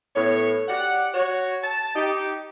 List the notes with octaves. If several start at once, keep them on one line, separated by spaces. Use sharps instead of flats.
A2 B3 C#5
G4 D5 F#5
F#4 C#5
A5
D#4 G4